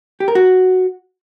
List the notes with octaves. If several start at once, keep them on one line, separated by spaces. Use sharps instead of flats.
G4
A#4
F#4